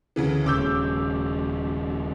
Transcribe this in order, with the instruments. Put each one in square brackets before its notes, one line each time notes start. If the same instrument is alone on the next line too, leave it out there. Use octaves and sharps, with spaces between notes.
[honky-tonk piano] D2 C#3 E3
[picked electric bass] D#1 C#3 [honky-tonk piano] D6 E6 G6